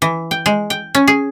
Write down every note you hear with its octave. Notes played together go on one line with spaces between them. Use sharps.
E3
G5
G#3
G5
C#4
G#4